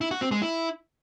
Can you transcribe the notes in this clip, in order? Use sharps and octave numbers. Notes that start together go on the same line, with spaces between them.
E4
F#4
C4
G#3
E4